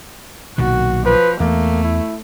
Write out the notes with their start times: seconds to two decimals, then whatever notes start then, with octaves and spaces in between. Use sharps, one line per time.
0.58 B1 A#2 D#3 F#4
1.06 F3 B4
1.40 E2 A3 A#3
1.84 E4